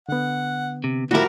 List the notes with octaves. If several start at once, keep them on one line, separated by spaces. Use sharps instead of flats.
D3 B3 F#5
C3
A2 F3 G3 E4 F#4 A#4